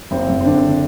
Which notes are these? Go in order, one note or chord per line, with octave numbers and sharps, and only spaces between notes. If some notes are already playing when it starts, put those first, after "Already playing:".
F#1 C4
F#1
C4
D3 D4